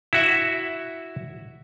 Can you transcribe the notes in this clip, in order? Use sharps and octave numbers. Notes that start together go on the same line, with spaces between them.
E4 F#4 E5